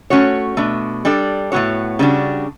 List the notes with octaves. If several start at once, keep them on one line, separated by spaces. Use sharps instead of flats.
A3 C#4 F#4 C#5
B2 A3 D4
G3 D4 A4 D5
A2 F#3 B3 F#4 C#5
C#3 G3 B3 D4 F#4